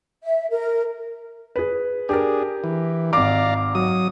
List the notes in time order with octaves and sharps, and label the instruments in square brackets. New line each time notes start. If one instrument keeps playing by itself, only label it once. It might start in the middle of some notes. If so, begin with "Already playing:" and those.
[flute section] E5
A#4
[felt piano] G#4 B4
[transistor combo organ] D4 G#4 [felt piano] G4 A#4
[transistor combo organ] E3
[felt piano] G#1 D6 [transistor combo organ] D5 F5 A#5
[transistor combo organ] F#3 D#6